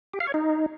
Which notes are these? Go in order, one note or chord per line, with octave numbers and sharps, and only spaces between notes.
G4
F5
C#5
D#4